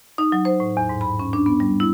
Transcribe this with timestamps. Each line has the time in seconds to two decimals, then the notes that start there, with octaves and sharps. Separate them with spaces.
0.18 D#4
0.32 F#3
0.45 C5
0.60 A2
0.77 E2
0.89 G#2
1.01 B5
1.19 C#4
1.33 D4
1.46 B3
1.60 G3
1.80 E4